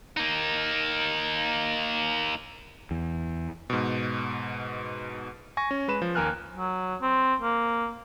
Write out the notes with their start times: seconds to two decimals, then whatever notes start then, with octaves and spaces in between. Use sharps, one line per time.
0.17 A#3 D#4
2.91 E2
3.70 G#2 B2
5.57 G#5 C#6 A#6
5.71 C#4
5.88 G#3 B4 E7
6.02 F3
6.15 D#2 A#3 A#4 G#5 F6 F#6
6.56 F#3
7.01 C4
7.41 A#3